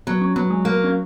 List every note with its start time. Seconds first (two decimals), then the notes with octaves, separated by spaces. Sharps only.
0.07 F#3 B3
0.22 C#4
0.36 F#3 B3
0.50 G#3
0.65 A#3 B3
0.84 C#4